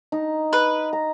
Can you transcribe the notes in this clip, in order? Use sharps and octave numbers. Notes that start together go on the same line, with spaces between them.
D#4
B4
A#5